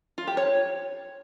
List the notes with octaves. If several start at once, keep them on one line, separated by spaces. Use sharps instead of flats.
F4
G4
C#5